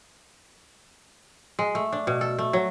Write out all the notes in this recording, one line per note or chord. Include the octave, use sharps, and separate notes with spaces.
G#3
A3
D4
B2
A4
A3
F#3